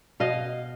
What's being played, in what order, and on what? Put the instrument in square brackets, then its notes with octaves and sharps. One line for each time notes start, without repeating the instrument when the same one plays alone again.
[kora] B2 D#5 F5